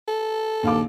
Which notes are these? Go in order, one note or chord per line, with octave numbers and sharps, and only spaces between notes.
A4
A#1 D#2 F5 D6